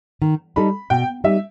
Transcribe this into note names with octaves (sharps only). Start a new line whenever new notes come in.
D#3
G3 D#4 A4 B5
B2 G5
G3 D#4 E5